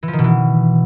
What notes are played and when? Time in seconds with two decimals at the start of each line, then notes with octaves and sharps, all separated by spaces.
0.03 E3
0.08 F3
0.13 D#3
0.19 B2
0.24 E3